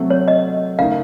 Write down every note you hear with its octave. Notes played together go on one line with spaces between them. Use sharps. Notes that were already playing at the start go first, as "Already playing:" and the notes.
Already playing: C3 F#3 A3 C4
C#5
D#5
C#3 A3 D#4 A#4 F5